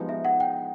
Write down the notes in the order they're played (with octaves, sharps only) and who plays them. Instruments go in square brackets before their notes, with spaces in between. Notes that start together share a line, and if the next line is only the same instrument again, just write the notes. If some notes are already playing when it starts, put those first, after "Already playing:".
Already playing: [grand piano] F3 G#3 B3 D#4 G4
[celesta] E5
F#5
G5